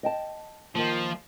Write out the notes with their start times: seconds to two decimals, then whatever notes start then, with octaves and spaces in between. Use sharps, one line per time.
0.03 D#5 G5 A5
0.75 D#3 F3 A#3